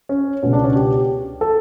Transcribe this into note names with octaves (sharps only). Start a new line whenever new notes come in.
C#4
C#2 B2 C#4
D4
C#4
G4
A4